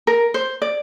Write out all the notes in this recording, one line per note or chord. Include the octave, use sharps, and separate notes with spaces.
A#4
C5
D5